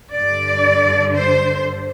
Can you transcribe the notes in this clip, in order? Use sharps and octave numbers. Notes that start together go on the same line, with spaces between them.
G2 D3 D5
C5